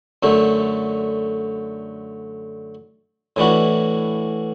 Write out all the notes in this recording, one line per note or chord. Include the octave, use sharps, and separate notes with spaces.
F#2 D3 A3
A2 E3 D4 F#4